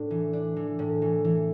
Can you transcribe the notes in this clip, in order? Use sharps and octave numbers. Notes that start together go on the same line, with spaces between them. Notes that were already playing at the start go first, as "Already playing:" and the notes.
Already playing: A2 D4
E3
D4
E3
A2
E3
E3